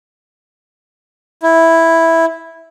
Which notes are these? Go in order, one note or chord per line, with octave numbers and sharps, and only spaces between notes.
E4